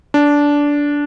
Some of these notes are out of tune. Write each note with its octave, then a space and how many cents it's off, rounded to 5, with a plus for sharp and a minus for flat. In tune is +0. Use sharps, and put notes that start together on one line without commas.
D4 -15